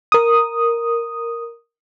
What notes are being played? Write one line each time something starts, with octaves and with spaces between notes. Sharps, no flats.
A#4 D#6